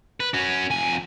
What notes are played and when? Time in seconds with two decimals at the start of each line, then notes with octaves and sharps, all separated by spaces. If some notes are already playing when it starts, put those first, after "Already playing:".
0.20 B4
0.34 C#4 F#4
0.71 F2 G#5